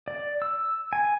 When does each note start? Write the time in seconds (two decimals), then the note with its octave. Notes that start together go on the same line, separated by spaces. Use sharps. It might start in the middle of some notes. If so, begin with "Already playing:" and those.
0.08 D5
0.42 E6
0.93 G#5